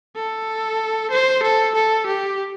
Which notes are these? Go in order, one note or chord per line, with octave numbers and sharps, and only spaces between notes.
A4
C5
A4
A4
G4